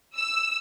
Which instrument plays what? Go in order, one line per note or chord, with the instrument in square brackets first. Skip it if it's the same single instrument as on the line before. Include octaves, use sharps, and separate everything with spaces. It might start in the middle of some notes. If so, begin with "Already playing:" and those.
[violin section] E6